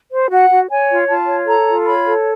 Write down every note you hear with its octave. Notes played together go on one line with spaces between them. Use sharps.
C5
F#4 F#5
F#4
C#5 G#5
F4
F4 A5
C#5
A4 A#5
F4
C#5 B5
A4